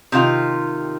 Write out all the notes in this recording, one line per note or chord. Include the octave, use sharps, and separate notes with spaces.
C3 D#3 F4